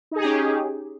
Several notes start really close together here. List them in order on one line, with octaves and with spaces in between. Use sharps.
D#4 G#4 G4 C#4